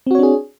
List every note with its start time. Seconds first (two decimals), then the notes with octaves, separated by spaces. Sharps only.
0.07 C4
0.11 F#4
0.15 C#5
0.19 D4
0.23 G#4